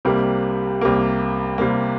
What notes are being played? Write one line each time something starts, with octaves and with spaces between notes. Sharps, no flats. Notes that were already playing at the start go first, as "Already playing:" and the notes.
C2 C3 G3 A#3
C2 C3 G3 A#3
C2 C3 G3 A#3